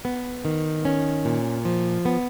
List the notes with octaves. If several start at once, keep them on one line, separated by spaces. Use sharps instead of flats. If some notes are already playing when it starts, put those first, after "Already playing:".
B3
D#3
C#4
A#2
F3
B3